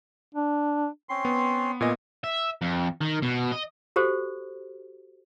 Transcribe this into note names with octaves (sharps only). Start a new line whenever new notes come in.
D4
C4 C#4 C6
B3
A#2 B3 D#5 G#5
E5
F2
D#3
B2
D#5
F#4 G4 A4 C5